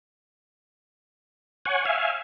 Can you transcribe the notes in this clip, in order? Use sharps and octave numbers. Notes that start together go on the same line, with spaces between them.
C#5 F#5 G#5
E5 F5 G#5